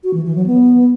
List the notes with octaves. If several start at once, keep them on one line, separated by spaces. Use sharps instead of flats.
F#4
E3
E3
F#3
B3